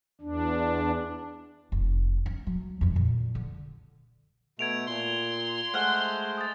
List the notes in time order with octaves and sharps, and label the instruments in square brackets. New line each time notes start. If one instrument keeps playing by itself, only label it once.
[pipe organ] E2 D4
[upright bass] F1
C#4
F#3
F2 E3
A#2 D3
D3
[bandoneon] B2 A3 [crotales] G#6 D7 F7
[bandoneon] A#2 [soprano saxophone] C6
[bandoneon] G#3 A3 C5 [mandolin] F#5 F6
[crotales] D#6 A6